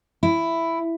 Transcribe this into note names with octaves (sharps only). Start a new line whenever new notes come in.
E4